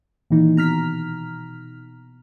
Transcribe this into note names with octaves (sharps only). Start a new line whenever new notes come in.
A#2 D#3 E3 D#4
B2 A#5 F6 B6